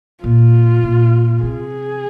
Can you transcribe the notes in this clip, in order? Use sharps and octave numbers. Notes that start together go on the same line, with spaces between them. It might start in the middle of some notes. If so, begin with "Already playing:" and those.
A#2 F4
A#2
C3 G#4